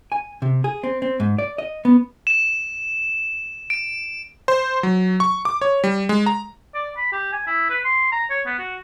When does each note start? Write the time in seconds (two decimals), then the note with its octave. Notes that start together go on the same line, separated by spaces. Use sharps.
0.12 G#5
0.42 C3
0.64 G#4
0.83 C4
1.02 C4
1.20 G#2
1.38 D5
1.58 D#5
1.85 B3
2.27 E7
3.70 D7
4.48 C5
4.83 F#3
5.20 C#6
5.45 D6
5.61 C#5
5.84 G3
6.09 G#3
6.26 A#5
6.74 D5
6.97 B5
7.12 G4
7.32 G#5
7.47 E4
7.70 B4
7.85 C6
8.12 A#5
8.30 C#5
8.46 B3
8.59 F#4